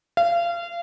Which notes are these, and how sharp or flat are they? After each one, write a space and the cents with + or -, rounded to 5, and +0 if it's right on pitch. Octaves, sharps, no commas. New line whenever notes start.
F5 -30